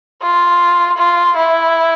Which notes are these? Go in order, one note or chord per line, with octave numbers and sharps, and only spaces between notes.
F4
F4
E4